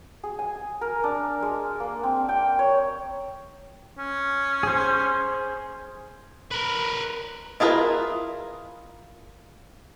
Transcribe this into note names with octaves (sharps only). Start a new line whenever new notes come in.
G#4
G#5
A#4
D4
G#3
A#3
C4
G5
C#5
C#4
G#4 C5
A#4 B4
E4 F4 G#4 A#4 B4